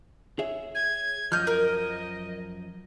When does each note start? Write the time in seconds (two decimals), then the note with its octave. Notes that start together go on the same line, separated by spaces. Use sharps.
0.39 G#4 C#5 E5
0.75 G#6
1.32 F#2 F3 D#5 F6 G6
1.47 A#4